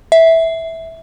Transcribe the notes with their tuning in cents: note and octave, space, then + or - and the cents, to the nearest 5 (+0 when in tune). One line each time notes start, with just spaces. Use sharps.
E5 -10